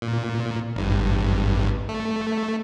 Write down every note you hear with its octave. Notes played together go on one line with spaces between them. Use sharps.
A#2
G#1 G2
A3